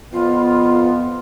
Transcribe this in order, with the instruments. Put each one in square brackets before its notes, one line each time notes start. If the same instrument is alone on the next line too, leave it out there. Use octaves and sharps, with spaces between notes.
[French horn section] F2 B3 [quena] F4